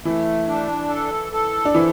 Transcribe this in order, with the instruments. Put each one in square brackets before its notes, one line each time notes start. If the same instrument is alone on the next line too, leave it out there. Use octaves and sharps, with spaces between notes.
[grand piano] E3 E4 [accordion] A3
[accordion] D4
A4
A4
[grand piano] D4
[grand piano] E3 E4 [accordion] F3